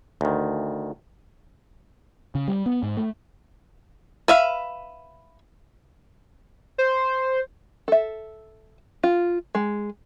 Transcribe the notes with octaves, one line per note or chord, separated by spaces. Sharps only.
D2 D#3
C#3
G3
B3
G#2
A3
B4 E5 F5
C5
A4 E5
F4
G#3